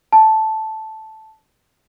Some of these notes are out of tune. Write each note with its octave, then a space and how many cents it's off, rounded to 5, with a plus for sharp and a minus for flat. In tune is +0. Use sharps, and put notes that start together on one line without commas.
A5 -5